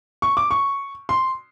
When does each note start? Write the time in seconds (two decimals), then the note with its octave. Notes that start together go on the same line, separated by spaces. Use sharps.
0.22 C#6
0.37 D6
0.51 C#6
1.09 C6